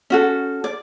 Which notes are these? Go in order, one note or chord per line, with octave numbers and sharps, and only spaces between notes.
C#4 F#4 A4
D5